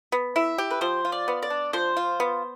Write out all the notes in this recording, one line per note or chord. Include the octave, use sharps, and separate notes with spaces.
B3
E4 E5
G4
B4
F3 C5
F4
D5
B3
D5
D4
F3 C5
F4
B3